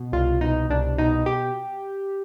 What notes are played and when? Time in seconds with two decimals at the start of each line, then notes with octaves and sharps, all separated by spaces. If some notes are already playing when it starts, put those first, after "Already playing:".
Already playing: B2
0.12 C2 F4
0.41 B2 D#4
0.70 C2 D4
0.98 B2 D#4
1.26 G4